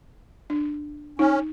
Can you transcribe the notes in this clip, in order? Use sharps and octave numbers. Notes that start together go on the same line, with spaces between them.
D4
C#4 D#4